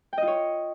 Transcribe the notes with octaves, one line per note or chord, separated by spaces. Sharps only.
F4 C#5 D#5 G5